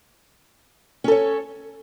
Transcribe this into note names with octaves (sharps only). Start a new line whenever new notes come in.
C#4 A4 C#5